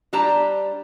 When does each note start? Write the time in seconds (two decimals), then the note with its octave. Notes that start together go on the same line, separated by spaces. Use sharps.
0.13 G3 D4 G4 C5 A#5